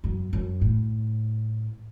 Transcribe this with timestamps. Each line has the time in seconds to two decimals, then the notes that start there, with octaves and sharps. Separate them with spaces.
0.04 F#2
0.33 F#2
0.61 A2